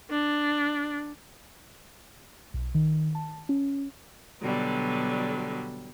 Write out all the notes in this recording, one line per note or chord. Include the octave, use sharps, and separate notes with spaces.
D4
B1
D#3
A5
C#4
B2 D3 F#3 G3